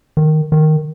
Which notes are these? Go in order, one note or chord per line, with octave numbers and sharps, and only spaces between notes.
D#3
D#3